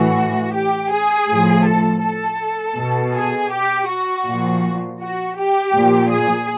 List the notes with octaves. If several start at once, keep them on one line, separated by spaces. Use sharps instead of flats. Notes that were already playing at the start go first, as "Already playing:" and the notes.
Already playing: A2 E3 F#4
G4
G#4
A2 F3
A4
A4
B2
G#4
G4
F#4
A#2 F3
F#4
G4
A#2 F3
G#4